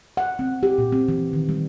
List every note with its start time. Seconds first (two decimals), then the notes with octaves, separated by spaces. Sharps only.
0.17 F#5
0.39 C4
0.63 G4
0.78 A#2
0.92 C4
1.08 E3
1.33 D#3
1.49 G3